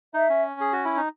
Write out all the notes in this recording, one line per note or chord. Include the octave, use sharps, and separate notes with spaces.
D#4 E5
C#4
G#4
F#4
E4
D#4